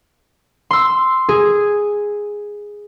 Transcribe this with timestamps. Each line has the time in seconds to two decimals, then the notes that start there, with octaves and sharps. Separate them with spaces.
0.71 C6 E6
1.29 G#4